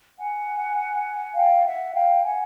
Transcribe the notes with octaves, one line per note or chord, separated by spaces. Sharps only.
F#5 G#5
F5 G5
E5 F#5
F5 G5
F#5 G#5